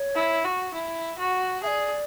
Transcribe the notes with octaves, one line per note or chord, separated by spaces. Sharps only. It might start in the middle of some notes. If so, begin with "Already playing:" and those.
Already playing: C#5
E4
F#4
E4
F#4
G#4 D5 E5